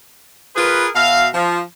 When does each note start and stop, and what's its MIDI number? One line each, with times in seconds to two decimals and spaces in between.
0.56 0.87 65
0.56 0.87 68
0.56 0.87 70
0.56 0.87 71
0.94 1.27 47
0.94 1.27 66
0.94 1.27 76
0.94 1.27 77
1.34 1.60 53